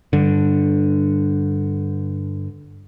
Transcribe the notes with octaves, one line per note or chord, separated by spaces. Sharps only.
G2 D3